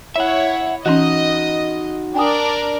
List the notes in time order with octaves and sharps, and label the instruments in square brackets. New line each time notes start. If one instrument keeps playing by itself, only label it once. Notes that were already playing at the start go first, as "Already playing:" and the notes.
[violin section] E4 C#5 [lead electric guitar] E5 F#5
[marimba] E3 C#4 [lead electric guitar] D#4 F#4 [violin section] D#5
[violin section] D4 A#4 D5 [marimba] G5 G#5 D#6